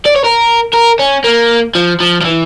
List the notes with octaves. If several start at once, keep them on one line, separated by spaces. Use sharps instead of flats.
D5
C#5
A#4
A#4
C#4
A#3
F3
F3
F3
E3